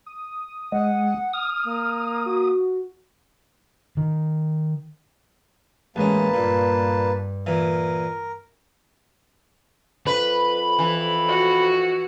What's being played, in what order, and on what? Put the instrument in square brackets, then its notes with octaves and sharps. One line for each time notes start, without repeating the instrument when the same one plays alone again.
[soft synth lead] D#6
[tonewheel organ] G#3 [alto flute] F#5
[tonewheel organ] D#6 [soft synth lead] F6
[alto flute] A#3
[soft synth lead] F#4
[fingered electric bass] D#3
[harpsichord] A1 C#4 [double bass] G#3 [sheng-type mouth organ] A#3 B4 A5
[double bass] G2 [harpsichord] A#2
[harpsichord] A#2 E3 [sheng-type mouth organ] A#4
[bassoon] F2 [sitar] B4 [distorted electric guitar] B5
[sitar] E3
[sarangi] F#4